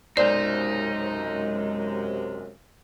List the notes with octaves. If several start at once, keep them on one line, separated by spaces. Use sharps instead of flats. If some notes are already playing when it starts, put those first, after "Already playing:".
B1 F#2 C3 G#3 D#4 C5 D5